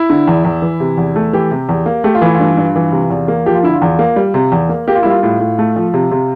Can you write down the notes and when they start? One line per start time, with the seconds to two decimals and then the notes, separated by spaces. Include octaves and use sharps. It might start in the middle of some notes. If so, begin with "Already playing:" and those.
Already playing: E4
0.10 D3
0.27 E2
0.45 E2
0.62 E3
0.80 C3
0.97 E2
1.16 A3
1.33 E3 G4
1.51 C3
1.69 E2
1.86 A#3
2.04 A3 G4
2.15 F4
2.22 E3 E4
2.35 F4
2.40 G2
2.57 G2
2.76 E3
2.92 C3
3.10 E2
3.28 A#3
3.46 F3 G4
3.55 F4
3.63 D3 E4
3.73 F4
3.82 E2
3.99 A#3
4.16 G3
4.34 C3
4.52 E2
4.69 A#3
4.87 A#3 G4
4.95 F4
5.03 E4
5.05 G3 F4
5.23 A2
5.40 A2
5.59 A3
5.76 F3
5.94 C3
6.11 C3